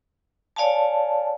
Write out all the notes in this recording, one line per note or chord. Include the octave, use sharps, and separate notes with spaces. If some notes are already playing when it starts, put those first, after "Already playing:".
C#5 D5 F5 G#5 A5